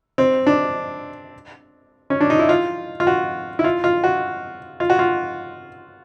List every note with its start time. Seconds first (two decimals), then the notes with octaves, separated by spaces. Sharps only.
0.18 C4
0.47 D4
2.10 C#4
2.21 D4
2.30 D#4
2.39 E4
2.49 F4
3.00 F4
3.07 F#4
3.59 E4
3.64 F4
3.84 F4
4.04 F#4
4.80 F4
4.90 F#4
4.99 F4